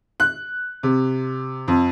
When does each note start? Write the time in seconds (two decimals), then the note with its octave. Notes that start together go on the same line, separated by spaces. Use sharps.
0.20 F#6
0.83 C3
1.68 F2